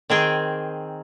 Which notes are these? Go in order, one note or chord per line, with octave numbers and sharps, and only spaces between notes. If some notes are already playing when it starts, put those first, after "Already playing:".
D#3 C4 G#4 G5